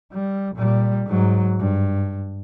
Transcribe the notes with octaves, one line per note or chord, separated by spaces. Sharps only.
G3
A#2 G3
G#2 F#3
G2